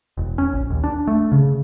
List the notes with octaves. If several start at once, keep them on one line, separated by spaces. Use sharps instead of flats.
E1
C#4
A#1
D#2
D4
A3
C#3